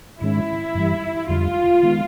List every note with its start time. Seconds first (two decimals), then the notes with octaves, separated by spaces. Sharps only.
0.21 G#2 D#3 G#3 C#4 E4
0.75 G2 E3 G3
1.29 F2 D3 G3 F4
1.83 D#3 G#3 B3